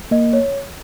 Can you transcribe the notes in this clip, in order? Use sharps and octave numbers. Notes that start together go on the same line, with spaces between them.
A#3 D#5
C#5